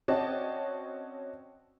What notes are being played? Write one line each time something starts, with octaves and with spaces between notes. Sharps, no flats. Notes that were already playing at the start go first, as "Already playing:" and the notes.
C4 C#4 F#4 D5 D#5 A5